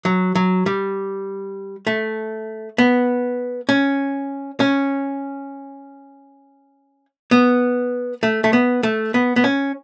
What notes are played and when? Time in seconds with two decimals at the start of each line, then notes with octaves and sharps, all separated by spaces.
0.05 F#3
0.35 F#3
0.66 G3
1.87 A3
2.78 B3
3.69 C#4
4.60 C#4
7.31 B3
8.23 A3
8.44 A3
8.53 B3
8.83 A3
9.14 B3
9.36 B3
9.44 C#4